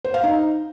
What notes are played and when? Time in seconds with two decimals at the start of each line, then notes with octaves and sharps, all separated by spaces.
0.05 C5
0.14 F5
0.23 D#4